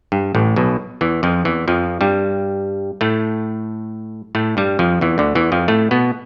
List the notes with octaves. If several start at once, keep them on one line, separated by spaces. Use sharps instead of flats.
G2
A1 A2
B1 B2
E2 E3
F2 F3
E2 E3
F2 F3
G2 G3
A2 A3
A2 A3
G2 G3
F2 F3
E2 E3
D2 D3
E2 E3
F2 F3
A2 A3
B2 B3